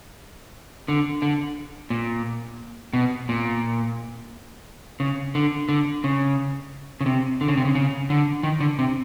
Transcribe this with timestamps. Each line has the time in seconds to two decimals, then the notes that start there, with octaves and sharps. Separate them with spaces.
0.88 D3
1.22 D3
1.90 A#2
2.93 B2
3.29 A#2
5.00 C#3
5.35 D3
5.69 D3
6.04 C#3
7.01 C#3
7.06 C3
7.41 D3
7.48 C#3
7.57 C3
7.65 C#3
7.75 C#3
8.10 D3
8.43 D#3
8.60 D3
8.79 C3